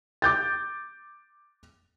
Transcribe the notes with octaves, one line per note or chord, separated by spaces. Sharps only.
D6 G6 A6